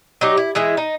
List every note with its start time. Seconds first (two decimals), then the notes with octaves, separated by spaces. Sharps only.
0.21 F#3 D#4 G4
0.37 E4
0.55 E3 G#3 E4
0.77 D#4